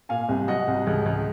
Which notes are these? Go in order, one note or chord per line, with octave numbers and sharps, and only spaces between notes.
A#2 F5 G#5
C2
F#3 D#5 F#5
C2
C#2
C#2